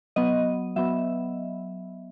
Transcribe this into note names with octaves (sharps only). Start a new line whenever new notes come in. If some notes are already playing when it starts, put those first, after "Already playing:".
F#3 B3 D#5
F#3 B3 E5